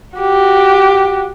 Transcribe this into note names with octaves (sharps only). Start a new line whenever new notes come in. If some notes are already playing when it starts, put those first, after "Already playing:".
F#4 G4